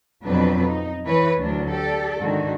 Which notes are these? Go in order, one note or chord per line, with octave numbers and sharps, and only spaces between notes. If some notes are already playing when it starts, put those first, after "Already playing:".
F2 B2 F#3 C4 D4 B4
D#4
E3 B4 C#5
D2 F#3 D4
G4 A4 D5
G#2 D3 D#3 F#4